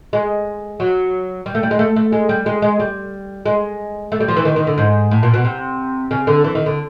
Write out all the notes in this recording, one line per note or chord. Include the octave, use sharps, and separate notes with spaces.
G#3
F#3
G3
A3
G3
G#3
A3
A3
G#3
G3
G#3
G#3
G3
G#3
A3
G3
F3
E3
D#3
D#3
D3
G#2
A2
A#2
B2
C3
C#3
D3
E3
D#3
D3